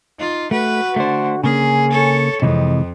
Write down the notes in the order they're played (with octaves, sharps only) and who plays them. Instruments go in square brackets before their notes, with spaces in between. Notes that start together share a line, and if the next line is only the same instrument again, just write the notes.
[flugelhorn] D#4 [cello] F4
[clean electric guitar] A3 [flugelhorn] F#4 [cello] B4
[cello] D3 [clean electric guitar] A3 C5
[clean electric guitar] C#3 A#3 C#4 [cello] G#4 [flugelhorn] G#5
[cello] A4 C#5
[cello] F2 [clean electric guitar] C3 E3 G#3 [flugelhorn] D#5